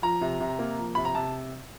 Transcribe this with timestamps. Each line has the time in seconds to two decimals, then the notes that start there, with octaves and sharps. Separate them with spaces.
0.02 F3 A#5
0.21 C3
0.40 C3
0.59 A#3
0.78 F3
0.95 C3 B5
1.05 A#5
1.15 C3 A5